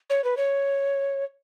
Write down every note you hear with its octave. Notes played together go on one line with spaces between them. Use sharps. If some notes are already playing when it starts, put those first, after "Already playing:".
C#5
B4
C#5